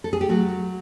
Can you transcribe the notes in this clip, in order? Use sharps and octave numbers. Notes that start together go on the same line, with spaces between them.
A4
G#4
G4
F#3 A3 F#4